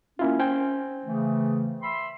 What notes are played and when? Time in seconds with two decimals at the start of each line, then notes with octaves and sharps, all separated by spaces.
0.19 A#3 C#4 E4 F4
0.39 C5 G5 G#5
1.04 C#3 E3 A3
1.82 E5 B5 C6